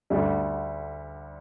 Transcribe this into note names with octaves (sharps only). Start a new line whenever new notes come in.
D2 D3 G3